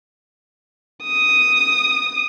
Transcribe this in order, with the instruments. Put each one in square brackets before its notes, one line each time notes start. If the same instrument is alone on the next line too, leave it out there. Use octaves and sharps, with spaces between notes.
[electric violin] D#6